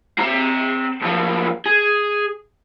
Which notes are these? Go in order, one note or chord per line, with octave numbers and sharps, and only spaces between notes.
C4 A#5
B1 F3
G#4